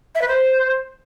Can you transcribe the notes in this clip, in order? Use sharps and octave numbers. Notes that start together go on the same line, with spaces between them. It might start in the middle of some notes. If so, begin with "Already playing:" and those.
E5
B4
C5